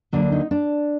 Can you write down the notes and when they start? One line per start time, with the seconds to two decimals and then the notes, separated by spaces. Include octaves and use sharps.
0.12 D2 D3 F#3 A#3 D4
0.32 D#4
0.51 D4